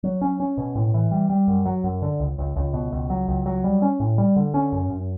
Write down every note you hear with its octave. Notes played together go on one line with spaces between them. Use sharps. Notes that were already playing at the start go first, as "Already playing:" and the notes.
F#3
C#4
C#4
B2
A2
E3
G3
G3
F#2
F#3
F#2
D3
C#2
C#2
C#2
B2
C#2
F#3
C#2
F#3
G3
C#4
A2
G3
D3
C#4
F#2
F#2